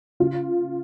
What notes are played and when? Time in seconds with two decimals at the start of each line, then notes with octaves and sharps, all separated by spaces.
0.20 C#3 F4